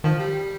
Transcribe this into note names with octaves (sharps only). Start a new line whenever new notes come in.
D#3 F3
G3